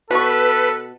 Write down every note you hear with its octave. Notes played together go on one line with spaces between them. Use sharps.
B2 A4 B4 C#6